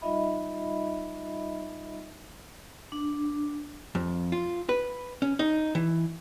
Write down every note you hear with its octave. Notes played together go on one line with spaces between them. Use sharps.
G3 D#4 F4 D#5 E5 B5
D4
F2
F4
B4
C#4
D#4
E3